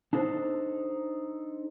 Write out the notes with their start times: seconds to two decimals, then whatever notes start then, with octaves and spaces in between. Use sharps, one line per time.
0.13 D4 D#4 A4 C5